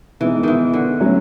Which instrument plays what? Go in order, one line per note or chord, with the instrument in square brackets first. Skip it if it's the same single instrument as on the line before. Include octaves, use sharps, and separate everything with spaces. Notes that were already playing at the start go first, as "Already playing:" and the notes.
[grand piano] B2 G#3 B3 D#4 [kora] E3
[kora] D#3 E3
D3
[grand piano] F#3 A3 C#4 E4